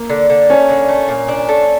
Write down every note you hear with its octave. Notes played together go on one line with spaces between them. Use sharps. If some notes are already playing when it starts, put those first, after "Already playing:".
Already playing: A#3
D3
D3
A3 C#4
D3
A3
A#2
D4
A3